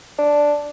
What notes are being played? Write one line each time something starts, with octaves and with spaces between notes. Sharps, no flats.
D4